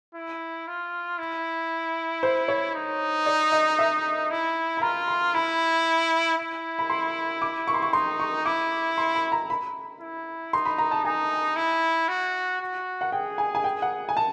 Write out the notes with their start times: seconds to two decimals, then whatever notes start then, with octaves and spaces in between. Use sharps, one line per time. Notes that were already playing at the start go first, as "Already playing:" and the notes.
0.15 E4
0.67 F4
1.19 E4
2.23 C5
2.48 C#5
2.75 D#4
3.26 D5
3.52 D#5
3.79 E5
4.31 E4
4.77 B5
4.82 F4 A#5
5.08 C6
5.34 E4 B5
6.38 E4
6.79 B5
6.90 C6
7.42 D6
7.68 C#6
7.74 C6
7.82 C#6
7.93 D#4 C6
8.20 C#6
8.46 E4 D6
8.98 C6
9.15 B5
9.32 A#5
9.50 B5
10.01 E4
10.53 D#4 C6
10.65 B5
10.78 A#5
10.91 A5
11.05 D#4 G#5
11.56 E4
12.08 F#4
12.61 F#4
13.01 F#5
13.12 G#4 G5
13.38 G#5
13.55 G#5
13.64 G5
13.82 F#5
14.09 G#5
14.17 A5